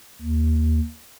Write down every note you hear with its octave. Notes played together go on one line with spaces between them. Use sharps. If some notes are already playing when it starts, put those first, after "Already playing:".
D#2